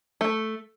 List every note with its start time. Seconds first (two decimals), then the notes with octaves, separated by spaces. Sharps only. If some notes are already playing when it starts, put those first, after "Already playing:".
0.21 A3